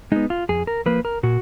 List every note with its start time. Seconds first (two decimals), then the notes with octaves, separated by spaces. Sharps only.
0.12 G#3 B3 D#4
0.30 F4
0.49 F2 G#4
0.67 A#4
0.86 F3 A#3 B4
1.05 A#4
1.23 A#2 F#4